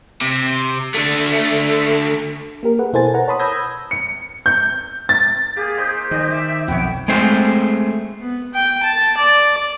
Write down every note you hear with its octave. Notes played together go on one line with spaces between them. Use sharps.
C3
D3 A3
A#3 G4 A#4
G#4 B4 F#5
B2 E4 A4 C5 G#5 A6
A#4 B4 F#5 A#5
C#5 A5 B5 C6 D#6
B5 D#6 E6 G6 G#6 A#6
C#7
G6
A6
A#3 G4 G#4
D#4 C5 D#5
D#3 G4 D5 D#5 G#5
E5
B1 F2 B3 C#5 G5
G#3 A3 C4 C5
B3
G5
A5
D5